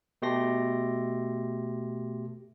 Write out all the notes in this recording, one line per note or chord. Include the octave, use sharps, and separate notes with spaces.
B2 A3 G4 C6 A#6